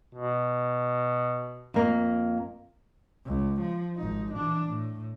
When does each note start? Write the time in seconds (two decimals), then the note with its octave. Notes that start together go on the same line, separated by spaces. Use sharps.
0.15 B2
1.74 F2 A#3
3.26 C#2
3.61 F3
3.97 G#1 D#4
4.35 E3 D4
4.66 A2